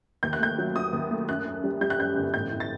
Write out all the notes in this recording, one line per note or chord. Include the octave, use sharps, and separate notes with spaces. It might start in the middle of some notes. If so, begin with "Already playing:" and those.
D#2 G6
F#6
A3 G6
F#3
F#3 D#6
D#2
A3
F#2 F#6
F#2
G3
G3 G6
F#6
F#2 G6
G1
A1 G6
A2
A6